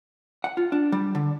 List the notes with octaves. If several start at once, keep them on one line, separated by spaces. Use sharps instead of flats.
F#5
F4
D4
G3
D3